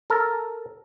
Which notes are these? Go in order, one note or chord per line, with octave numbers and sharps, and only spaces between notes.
A4 A#4